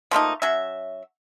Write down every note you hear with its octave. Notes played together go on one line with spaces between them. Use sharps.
F3 A3 A#3 D#4
F#3 C#4 E5